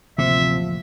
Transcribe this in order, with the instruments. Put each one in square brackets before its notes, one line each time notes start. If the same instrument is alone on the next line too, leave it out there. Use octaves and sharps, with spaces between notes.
[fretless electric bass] A1 D2 A#3 [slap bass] C3 [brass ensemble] F3 [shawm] E5